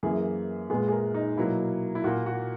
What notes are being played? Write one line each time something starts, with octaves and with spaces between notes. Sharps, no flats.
F#2 E3 A#3 G#4
A#2 G#3 B3 G#4
G#4
A#4
D#4
B2 F#3 A#3 E4
E4
A#2 A#3 F#4
F#4